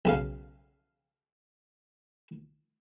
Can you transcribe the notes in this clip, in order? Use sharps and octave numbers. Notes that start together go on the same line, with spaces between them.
B1 C#3 F5